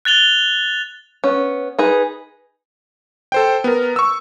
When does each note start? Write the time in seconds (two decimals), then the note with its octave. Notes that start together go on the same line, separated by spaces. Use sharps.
0.05 F#6 A6 F7 G7
1.24 B3 C#4
1.79 D#4 G#4 B4
3.32 A4 C5 G5
3.64 B3 A#4
3.96 C#6 E6